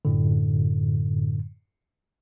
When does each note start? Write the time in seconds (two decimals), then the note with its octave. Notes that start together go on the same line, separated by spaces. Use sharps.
0.05 F#2 A2 D3